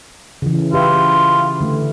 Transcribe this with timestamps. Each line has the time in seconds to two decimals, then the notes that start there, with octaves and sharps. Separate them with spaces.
0.42 C#3 E3
0.73 F4 G4 B4 E5
1.60 D3 A3